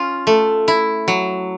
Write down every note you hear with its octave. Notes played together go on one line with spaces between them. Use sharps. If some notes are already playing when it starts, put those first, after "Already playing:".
Already playing: C#4 F4
A3
E4
F#3